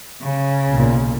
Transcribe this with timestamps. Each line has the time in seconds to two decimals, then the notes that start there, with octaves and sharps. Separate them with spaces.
0.22 C#3
0.71 B1 A#2